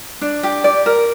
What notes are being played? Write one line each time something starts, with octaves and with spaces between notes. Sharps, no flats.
D4
G4
D5
A#4